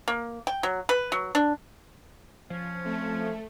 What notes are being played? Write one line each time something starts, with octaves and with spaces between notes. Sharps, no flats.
A#3
G5
F#3
B4
F#3
D4
F3 C#4
F2 A3